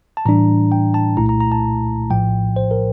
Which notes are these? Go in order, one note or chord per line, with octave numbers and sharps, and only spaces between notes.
A5
A2 E3 G3 D4 A#5
G5
A5
C2 A#2 A3 E4 A#5
A#5
A#5
A5
A#1 A2 F3 G5
C5
A#4